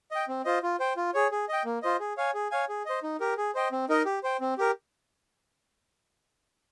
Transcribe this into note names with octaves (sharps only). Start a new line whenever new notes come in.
D#5 G5
C4
F4 C5 D#5
F4
C5 G5
F4
G#4 C#5
G#4
D#5 G5
A#3
F4 C5 D#5
G#4
C#5 F5 G#5
G#4
C#5 F5 G#5
G#4
C5 D#5
D#4
G4 A#4
G#4
C5 D#5 G5
C4
D#4 A#4 D#5
G4
C5 G5
C4
G4 A#4